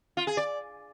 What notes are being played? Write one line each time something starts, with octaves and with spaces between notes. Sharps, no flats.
F4
G#4
D5